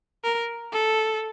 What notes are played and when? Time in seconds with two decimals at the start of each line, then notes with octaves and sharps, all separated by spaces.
0.24 A#4
0.73 A4